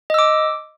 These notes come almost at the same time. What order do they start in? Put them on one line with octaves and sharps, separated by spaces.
D#5 E6 D6